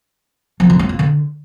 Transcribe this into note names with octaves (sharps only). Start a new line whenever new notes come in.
F3
D3
C#4
A#3
D3